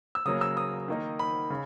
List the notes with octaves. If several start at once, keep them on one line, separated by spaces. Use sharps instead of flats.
E6
C#3 F#3 A#3 D#6
E6
D#6
D#3 A#3 D#4
B5
C#3